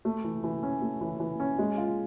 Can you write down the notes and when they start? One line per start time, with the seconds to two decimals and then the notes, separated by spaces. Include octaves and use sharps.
0.05 A3
0.24 E3
0.44 E3
0.63 C#4
0.82 A3
1.01 E3
1.20 E3
1.40 C#4
1.59 G#3
1.78 F4